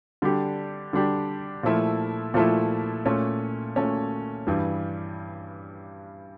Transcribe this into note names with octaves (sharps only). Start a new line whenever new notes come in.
D3 G3 D4 G4
D3 G3 D4 G4
A#2 F3 A3 E4
A#2 F3 A3 E4
A#2 A3 C#4
A#2 A3 C#4
G2 E3 G3